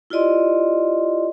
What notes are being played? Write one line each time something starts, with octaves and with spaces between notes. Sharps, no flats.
E4 F4 G4 D5 D#5 C6